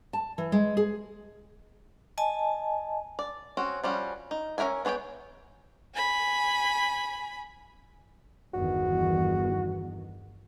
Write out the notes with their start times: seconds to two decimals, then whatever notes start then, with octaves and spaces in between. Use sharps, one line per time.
0.13 A5
0.38 E3
0.52 G#3
0.77 G#4
2.18 D#5 G#5 A5
3.19 D5
3.57 C4 C#4 F#4
3.84 F3 G3 C#4 F#4
4.31 D#4
4.58 C#4 G#4 A#4 E5 G#5
4.85 B3 G#4 C#5 D5 G5
5.94 G#5 B5
8.54 G1 E2 D#3 F#4